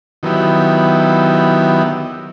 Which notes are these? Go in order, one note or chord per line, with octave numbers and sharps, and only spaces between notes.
D#3 F#3 B3 E4 G4